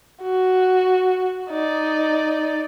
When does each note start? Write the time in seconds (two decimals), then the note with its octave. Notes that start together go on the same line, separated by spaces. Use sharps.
0.23 F#4
1.50 D#4 D5